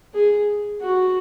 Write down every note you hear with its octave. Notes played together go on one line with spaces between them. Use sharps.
G#4
F#4